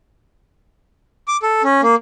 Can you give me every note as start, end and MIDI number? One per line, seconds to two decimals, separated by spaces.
1.28 1.37 86
1.43 1.63 69
1.64 1.81 61
1.82 1.95 58